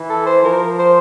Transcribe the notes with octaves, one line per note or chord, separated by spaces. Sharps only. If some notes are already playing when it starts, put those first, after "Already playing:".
Already playing: E3
A4
C5
F3 A#4
C5